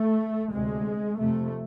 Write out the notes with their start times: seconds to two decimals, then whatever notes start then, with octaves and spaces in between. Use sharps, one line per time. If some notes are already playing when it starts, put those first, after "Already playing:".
Already playing: A3
0.53 D2 C3 G#3
1.20 F2 C3 A3